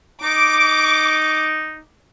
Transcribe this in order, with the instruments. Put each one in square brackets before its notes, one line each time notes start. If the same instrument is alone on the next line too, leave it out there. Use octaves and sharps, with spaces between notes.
[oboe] D#4 [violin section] D6